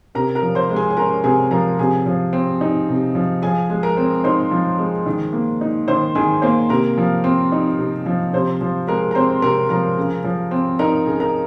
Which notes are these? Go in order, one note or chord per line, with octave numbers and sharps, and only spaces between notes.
C3 A#4 A#5
A#4 A#5
F3
C5 C6
G#3
G#4 G#5
G#5
C#4 A#4 A#5
C3 G#4 G#5
F3 A#4 A#5
C3 G#4 G#5
F3
C4
D#4
C3
F3
F3 G#4 G#5
G#3
A#4 A#5
C4
D#4 C5 C6
F3
G#3
D#3
A#3
D#4
D#3 C5 C6
D#3 G#4 G#5
A#3 C5 C6
C3 A#4 A#5
F3
C4
D#4
C3
F3
C3 C5
F3
G#3 A#4 A#5
A#5
C4 C5 C6
C3 A#4 A#5
F3 A#4 A#5
C#3
F3
C4
D#4 A#4 A#5
C#3
A#4 A#5